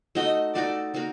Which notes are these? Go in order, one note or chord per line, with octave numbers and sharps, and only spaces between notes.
A3 D#4 F#4 A4 D#5
A3 D#4 F#4 A4 D5
A#3 D#4 F#4 A#4